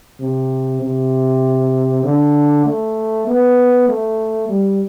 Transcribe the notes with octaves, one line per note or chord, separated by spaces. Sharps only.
C3
C3
D3
A3
B3
A3
G3